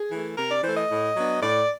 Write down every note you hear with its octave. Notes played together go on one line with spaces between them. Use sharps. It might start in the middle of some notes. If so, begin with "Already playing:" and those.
Already playing: G#4
E3 A3
C3 A#4
D5
E3 A3 C5
D#5
A2
F#3 B3 D4
A2 D5